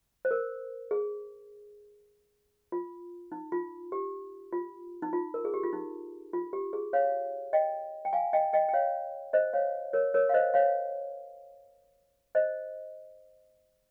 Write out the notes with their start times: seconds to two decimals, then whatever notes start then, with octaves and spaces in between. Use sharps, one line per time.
0.25 C5
0.31 A#4
0.91 G#4
2.72 F4
3.32 D#4
3.52 F4
3.92 G4
4.53 F4
5.02 D#4
5.13 F4
5.34 A#4
5.45 G#4
5.54 G4
5.63 F4
5.73 D#4
6.33 F4
6.53 G4
6.73 G#4
6.93 C#5 F5
7.53 D#5 G5
8.05 G5
8.13 F5 G#5
8.33 D#5 G5
8.53 D#5 G5
8.69 G5
8.73 C#5 F5
9.33 C5 D#5
9.53 C#5 F5
9.93 A#4 C#5
10.14 A#4 C#5
10.29 F5
10.34 C5 D#5
10.54 C#5 F5
12.35 C5 D#5